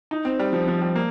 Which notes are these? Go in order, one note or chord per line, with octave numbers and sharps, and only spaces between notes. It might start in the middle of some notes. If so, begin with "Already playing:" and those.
D#4
C4
G3
F3
F3
G3
A#3